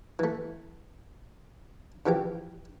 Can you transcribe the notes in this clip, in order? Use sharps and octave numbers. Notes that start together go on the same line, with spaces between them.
E3 A3
C#3 E3 F3 G4 G5